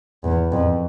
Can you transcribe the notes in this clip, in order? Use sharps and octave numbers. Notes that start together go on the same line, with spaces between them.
E2
F2